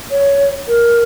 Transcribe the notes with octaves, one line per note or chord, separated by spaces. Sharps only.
C#5
A#4